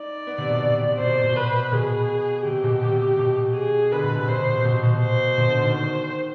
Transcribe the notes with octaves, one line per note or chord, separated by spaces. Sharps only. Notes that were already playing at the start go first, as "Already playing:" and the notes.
Already playing: D#4 D5
B3
C3
B2
C3
C3
B2 C5
B2
B4
B2 G#4
C3 G4
B2
C3
C3
C3
B2
G#4
D3 B4
B2
C3
B2 C5
C3
B2
B2
C5
B2
D3
D#3
C5